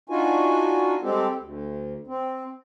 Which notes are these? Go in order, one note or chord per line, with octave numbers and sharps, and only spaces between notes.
D4 D#4 F4 F#4 G#5
G3 G#3 C4 G4 A4
D2
C4